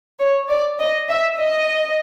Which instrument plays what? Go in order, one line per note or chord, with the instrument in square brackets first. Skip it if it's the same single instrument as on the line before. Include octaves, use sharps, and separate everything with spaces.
[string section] C#5
D5
D#5
E5
D#5